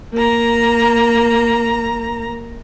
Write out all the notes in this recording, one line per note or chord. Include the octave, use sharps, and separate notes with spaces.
A#3 A#5